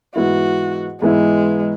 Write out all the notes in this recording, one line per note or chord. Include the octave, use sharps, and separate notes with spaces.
G#2 E3 B3 E4 F#4
G#2 E3 G#3 B3 E4